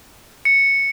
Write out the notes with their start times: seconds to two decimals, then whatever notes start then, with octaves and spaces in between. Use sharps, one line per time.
0.45 C#7